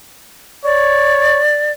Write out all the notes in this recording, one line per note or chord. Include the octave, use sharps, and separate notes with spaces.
C#5 D5